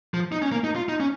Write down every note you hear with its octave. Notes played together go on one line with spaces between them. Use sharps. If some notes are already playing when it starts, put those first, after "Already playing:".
F3
D#4
C#4
A#3
D#4
F4
D#4
C#4